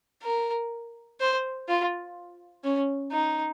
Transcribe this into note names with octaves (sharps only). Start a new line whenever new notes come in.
A#4
C5
F4
C#4
D#4